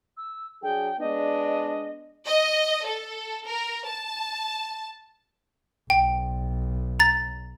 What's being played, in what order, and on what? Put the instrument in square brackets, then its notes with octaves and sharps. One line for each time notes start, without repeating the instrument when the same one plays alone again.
[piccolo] E6
[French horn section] F#3 D4 G#4 [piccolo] G5
[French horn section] G#3 B3 D4 [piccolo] D#5
[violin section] D#5
A4
A#4
A5
[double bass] B1 [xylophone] G5
[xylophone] A#5 A6